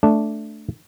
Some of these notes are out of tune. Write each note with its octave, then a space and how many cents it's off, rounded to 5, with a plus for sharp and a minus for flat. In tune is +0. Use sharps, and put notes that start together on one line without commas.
A3 +0 D4 +0